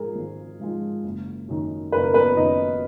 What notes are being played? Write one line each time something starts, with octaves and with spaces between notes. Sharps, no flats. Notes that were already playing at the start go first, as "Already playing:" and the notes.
Already playing: G#2 F3 G#3 G#4 A#4
G#1
G#2 F3 G#3
F#1
F#2 D#3
F#1 B4
A#4
B3 B4
F#2 D#3 D#4 D#5